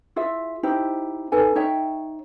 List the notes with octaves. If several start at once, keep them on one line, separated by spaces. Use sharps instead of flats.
E4 F4 G#4 E5
D#4 E4 G4 C5
D#4 A4 B4 G#5
D#4 C#5 E5 G5